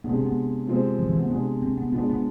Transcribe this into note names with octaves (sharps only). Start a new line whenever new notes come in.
C3 G#3 B3 D4 G#4
C4
B3
C3 F3 G#3 C4
F3
E3
B3
C3 G#3 B3 D4 G#4
C4
B3
F3 G#3 B3 D4
B3